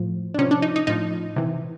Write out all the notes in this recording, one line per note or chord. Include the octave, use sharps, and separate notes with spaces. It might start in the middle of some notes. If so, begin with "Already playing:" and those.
Already playing: A2 F3
D4
C3 F3 C#4
D4
D#4
D#4
A2 F3 D#4
C3 E3